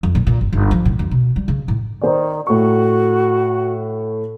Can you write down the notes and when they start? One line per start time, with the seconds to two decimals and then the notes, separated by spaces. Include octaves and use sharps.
0.03 F2
0.15 A#2
0.27 A#2
0.41 G1
0.53 G1
0.71 F3
0.85 A2
0.99 D2
1.11 B2
1.36 G3
1.48 C#3
1.68 A2
2.01 D#3 C5 D5
2.47 A2 F#4 C#6